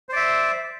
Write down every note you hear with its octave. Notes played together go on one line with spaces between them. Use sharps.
C5 D5 E5